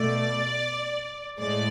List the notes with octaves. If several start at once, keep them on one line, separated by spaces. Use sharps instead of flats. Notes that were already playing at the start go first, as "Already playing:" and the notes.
Already playing: B2 A3 D5
A2 G#3 D5